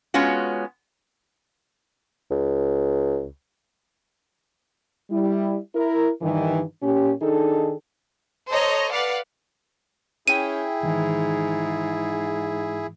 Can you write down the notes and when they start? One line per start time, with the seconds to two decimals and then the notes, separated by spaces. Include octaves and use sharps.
0.14 G#3 B3 C#4 F4 F#4
2.30 C#2
5.11 G3 E4
5.75 E4 A#4
6.22 G2 D#3 E3
6.82 A#2 C#4 G4
7.22 D#3 D4 D#4 G#4 A4
8.50 A4 C5 C#5 D#5 A#5
8.92 B4 D5 F5 F#5
10.28 C#4 E4 G#4 E5 G5 D#7
10.83 G#2 D#3 E3